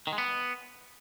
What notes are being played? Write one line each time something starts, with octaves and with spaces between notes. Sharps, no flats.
D#3
G#3
B3